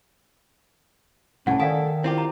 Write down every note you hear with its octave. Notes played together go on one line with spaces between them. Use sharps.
C2 A2 C#4 F#5 A5
D#3 A4 D5 F5 G#5
C4 E4 F4 G4
A#5